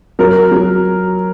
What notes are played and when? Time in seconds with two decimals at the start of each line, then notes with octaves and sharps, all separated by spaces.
0.19 F#3 A#4
0.51 F#3